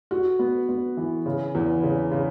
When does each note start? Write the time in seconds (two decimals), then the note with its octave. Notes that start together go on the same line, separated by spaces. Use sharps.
0.11 F#4
0.39 B3
0.69 B3
0.97 E3
1.26 C#3
1.55 E2
1.83 C#3
2.12 C#3